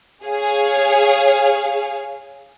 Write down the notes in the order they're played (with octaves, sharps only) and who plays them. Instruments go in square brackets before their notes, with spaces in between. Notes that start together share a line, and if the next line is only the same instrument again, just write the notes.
[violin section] G#4 C#5 F5